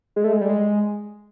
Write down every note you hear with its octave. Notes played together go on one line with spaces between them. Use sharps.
G#3
A3
G#3
G3
G#3